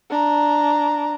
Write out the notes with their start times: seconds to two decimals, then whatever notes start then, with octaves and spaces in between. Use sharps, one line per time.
0.10 D4 A#5